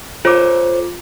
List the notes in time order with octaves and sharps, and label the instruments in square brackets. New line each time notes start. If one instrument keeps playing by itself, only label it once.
[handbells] F4 D6 [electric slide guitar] A4 C5 C#5